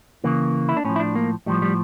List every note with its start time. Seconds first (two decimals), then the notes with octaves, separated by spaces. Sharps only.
0.24 C#3 E3 A#3
0.69 E4
0.77 D4
0.85 A2 F3 C#4
0.96 E4
1.00 D4
1.16 A#3
1.46 A2 F3 G3
1.62 G3